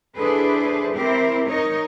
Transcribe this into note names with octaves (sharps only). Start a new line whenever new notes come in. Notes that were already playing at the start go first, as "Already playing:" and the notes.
D4 E4 G#4 A4 B4 C5
C4 E4 G4 A#4 C5
D#4 A#4 C#5 D#5